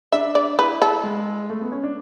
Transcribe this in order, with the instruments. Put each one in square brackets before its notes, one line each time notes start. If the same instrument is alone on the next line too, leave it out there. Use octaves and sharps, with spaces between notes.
[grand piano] D4 [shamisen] E5
[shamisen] D5
[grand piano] E4 [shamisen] B4
[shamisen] A4
[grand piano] G#3
A3
B3
C#4
D4